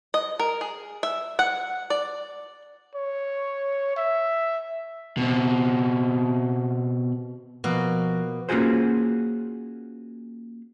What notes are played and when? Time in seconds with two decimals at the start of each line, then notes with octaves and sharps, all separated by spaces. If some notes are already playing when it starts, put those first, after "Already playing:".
0.14 D#5
0.40 A#4
0.61 G#4
1.03 E5
1.39 F#5
1.90 D5
2.95 C#5
3.97 E5
5.17 B2 C4
7.64 B2 F3 A#3 F#4
8.49 A#3 C#4 F4 F#4 G#4 C5